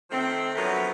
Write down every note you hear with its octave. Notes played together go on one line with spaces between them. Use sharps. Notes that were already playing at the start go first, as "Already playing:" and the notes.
D#3 F3 A3 C4
D2 F3 F#3 A3 B3 A#4